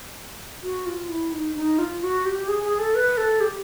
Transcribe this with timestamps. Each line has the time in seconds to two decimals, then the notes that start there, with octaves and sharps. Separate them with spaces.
0.63 F#4
0.86 F4
1.09 E4
1.32 D#4
1.55 D#4
1.78 F4
2.02 F#4
2.25 G4
2.48 G#4
2.64 G#4
2.79 A4
2.95 B4
3.17 A4
3.41 G4